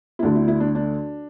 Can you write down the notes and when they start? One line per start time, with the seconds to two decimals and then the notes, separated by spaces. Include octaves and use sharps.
0.19 E4
0.22 D2 D3 A3 D4
0.35 E4
0.48 E4
0.60 D4
0.75 D4